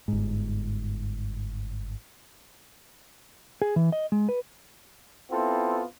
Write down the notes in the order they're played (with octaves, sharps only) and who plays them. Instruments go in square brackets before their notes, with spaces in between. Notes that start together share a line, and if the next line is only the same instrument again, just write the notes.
[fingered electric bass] G1 G#2
[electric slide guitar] G#4
E3
D#5
G#3
B4
[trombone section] B3 C4 E4 F4 A4